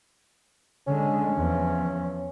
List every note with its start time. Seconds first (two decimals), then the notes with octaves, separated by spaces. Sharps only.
0.87 D3 G#3 C#4
1.32 E2 F3